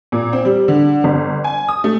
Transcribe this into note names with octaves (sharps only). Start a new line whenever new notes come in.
A#2
C4
G3
D3
G1
G#5
D#6
A3